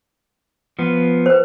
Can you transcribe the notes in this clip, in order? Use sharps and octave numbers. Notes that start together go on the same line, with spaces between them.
F3 B3
B4 C5